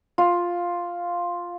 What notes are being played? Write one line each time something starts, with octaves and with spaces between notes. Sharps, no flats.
F4